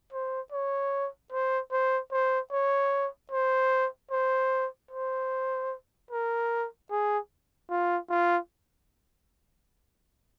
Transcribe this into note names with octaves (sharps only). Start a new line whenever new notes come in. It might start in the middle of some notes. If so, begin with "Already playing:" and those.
C5
C#5
C5
C5
C5
C#5
C5
C5
C5
A#4
G#4
F4
F4